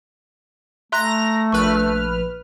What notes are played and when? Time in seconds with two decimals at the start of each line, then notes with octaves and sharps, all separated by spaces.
0.92 A3 E5 A#5 C6 F#6 A#6
1.52 A#1 B4 C#6 F6 F#6